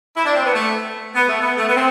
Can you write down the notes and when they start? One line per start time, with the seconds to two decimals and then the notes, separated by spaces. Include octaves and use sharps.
0.15 E4
0.25 D4
0.35 C4
0.44 B3
0.55 A3
1.15 B3
1.28 A3
1.41 B3
1.58 A3
1.68 B3
1.76 C4